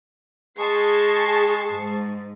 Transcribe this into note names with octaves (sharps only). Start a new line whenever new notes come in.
G#3 G#4 A5 C#6 C7
G#2